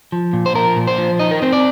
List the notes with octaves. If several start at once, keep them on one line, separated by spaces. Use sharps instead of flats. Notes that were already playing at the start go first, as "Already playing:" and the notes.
F3
A#2
C5
F3 A#4
A#2
C5
F3
D#4 D#5
A#4
C4 C5
D5